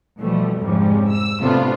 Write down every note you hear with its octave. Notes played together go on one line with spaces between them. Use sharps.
B2 E3 F3 G3 A3
F2 G#2 C3 F3 G3 C#4
E6
A2 C3 A3 B3 D4 F4